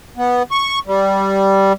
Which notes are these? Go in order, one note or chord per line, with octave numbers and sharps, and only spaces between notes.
B3
C#6
G3